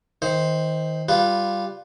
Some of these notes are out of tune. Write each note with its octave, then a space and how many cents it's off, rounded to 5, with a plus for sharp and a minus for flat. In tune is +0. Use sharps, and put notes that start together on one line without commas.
D#3 +25 C5 +0
G3 +0 F4 +0 B4 +0